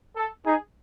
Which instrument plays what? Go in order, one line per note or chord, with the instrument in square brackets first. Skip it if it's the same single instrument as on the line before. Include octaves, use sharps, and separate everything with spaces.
[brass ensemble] A4
[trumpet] D#4 [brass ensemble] G#4